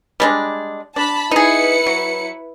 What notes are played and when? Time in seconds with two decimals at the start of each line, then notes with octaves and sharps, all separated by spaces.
0.20 G3 G#3 D4
0.96 D4 A5 B5
1.31 D#4 E4 G#4 B4 C#7
1.86 F#3